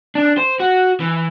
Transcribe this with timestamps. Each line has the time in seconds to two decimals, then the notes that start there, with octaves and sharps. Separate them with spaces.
0.15 D4
0.38 C5
0.60 F#4
1.00 E3